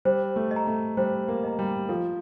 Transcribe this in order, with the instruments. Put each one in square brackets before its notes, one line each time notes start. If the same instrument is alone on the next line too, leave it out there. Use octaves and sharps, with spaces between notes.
[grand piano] G3 [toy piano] C5
[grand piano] A3
[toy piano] D#5
A#5
[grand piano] A3
[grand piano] G3 [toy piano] C5
[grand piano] A#3
[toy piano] D#5 A#5
[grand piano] G3
[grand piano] F3 [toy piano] A4